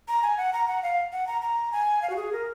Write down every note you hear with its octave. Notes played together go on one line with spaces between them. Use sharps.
A#5
G#5
F#5
A#5
F#5
F5
F#5
A#5
A#5
G#5
F5
F#4
G#4
A#4